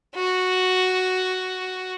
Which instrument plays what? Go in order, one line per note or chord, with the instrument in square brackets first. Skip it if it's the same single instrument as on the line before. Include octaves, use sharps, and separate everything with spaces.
[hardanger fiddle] F#4